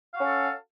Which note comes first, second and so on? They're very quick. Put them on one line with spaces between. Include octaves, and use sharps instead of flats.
F5 F#4 C#4 A4